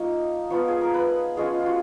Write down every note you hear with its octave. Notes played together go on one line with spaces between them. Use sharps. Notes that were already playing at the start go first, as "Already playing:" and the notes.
Already playing: F3 A#3 D#4 C#5 D#5
F3 B3 F4 C#5
G#4
A#4
B4
F3 G#3 C#4 F4 G#4
F4
F#4